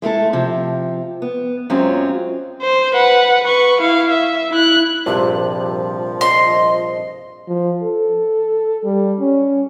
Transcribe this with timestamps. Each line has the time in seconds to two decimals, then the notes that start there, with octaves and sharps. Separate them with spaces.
0.02 G#3 A3 E4 A4
0.33 C3 F3
1.22 B3
1.70 F#2 F#3 G#3 C4 C#4 F4
2.62 C5
2.94 B4 F#5
3.43 B4 C#6
3.81 E4 F5
4.10 E5
4.50 E4 F#6
5.06 A#1 G2 C3 F3 G4
6.21 D#5 C6
7.47 F3
7.83 A4
8.84 G3
9.19 C#4